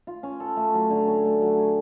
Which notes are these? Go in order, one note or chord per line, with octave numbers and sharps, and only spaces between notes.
F4
C#4
A4
A3
F#3
D3
C#4
A3
F#3
G#4